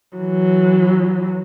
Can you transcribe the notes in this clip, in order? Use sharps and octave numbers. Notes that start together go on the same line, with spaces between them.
E3 F#3